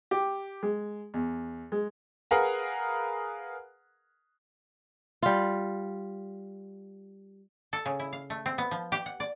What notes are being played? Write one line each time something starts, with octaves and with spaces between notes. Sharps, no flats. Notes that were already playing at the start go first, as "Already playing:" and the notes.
G4
G#3
E2
G#3
G#4 A#4 B4 F5 F#5 A#5
G3 F4
A4
C#3
E4
F5
A3
C4
B3
F3
G4
F#5
D5